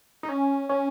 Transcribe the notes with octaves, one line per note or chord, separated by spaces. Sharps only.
D#4
C#4
C#4